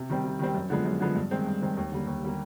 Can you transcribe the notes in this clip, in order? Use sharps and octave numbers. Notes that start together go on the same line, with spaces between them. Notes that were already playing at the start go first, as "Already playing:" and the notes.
Already playing: C3
D#3 G3 C4
C3
D#3 G3 C4
F#2
D3 F3 G#3 B3
F#2
D3 F3 G#3 B3
G2
D#3 G#3 C4
G2
D#3 G#3 C4
D#2
D3 G3 A#3
D#2
D3 G3 A#3